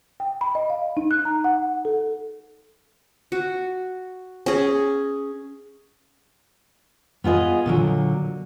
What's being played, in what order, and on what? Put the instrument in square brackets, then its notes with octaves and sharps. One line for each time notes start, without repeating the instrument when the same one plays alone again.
[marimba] G5
B5
D#5
F5
D#4
F#6
A#5
F#5
A4
[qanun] F#4
C#4 G#4
[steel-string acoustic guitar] B3 F4 G#4 D#5
A#2 D3 F#3